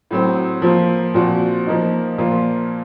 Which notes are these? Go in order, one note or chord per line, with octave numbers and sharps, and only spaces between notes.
A2 F#3 C4
F3 A#3 F4
A#2 F3 C4 F#4
F3 A#3 D#4
A#2 F3 A#3 F4